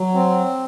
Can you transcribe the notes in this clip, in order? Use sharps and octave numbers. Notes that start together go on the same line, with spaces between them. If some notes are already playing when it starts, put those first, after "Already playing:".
Already playing: F#3
C4